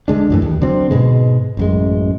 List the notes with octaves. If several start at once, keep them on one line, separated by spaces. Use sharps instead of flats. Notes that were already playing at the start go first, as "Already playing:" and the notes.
D3 G#3 D4
F#2 A2 E3
D#2
D3 F#3 C4
G#2 B2 G#3
A1 F#2 G#3